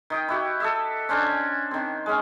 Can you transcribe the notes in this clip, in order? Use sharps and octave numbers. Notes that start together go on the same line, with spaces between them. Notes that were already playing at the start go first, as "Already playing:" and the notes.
D#3 D#5 G5
E4 F#4 G4
A4 D#5 E5
C#4 D4 C5 G#5
D#3 C4
G#3 C#4